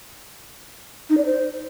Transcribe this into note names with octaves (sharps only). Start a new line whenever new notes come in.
D#4
D5
C5